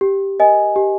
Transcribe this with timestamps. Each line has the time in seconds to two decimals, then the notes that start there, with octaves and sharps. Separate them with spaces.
0.01 G4
0.39 A#4 D#5 G#5
0.76 G4